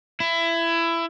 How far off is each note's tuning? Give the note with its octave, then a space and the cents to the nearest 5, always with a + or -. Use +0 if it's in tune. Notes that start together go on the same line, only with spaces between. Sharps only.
E4 +20